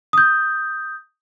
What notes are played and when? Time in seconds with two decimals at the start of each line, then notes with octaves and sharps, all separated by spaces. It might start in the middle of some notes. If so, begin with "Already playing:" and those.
0.13 D#6 G6